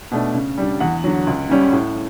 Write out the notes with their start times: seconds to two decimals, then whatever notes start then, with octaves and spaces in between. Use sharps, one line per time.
0.12 B2 A3 D4
0.34 C#3
0.58 G3 D4
0.80 E2 F#5
1.04 D3 F#3
1.27 C#2
1.49 C#3 G3 C#4
1.72 A2